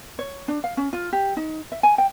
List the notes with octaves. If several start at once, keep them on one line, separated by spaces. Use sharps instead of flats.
C#5
D4
F5
C#4
F4
G4
D#4
E5
G#5
G5